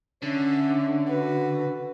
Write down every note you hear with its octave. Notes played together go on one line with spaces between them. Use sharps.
D3 C#4 E5
F#4 B4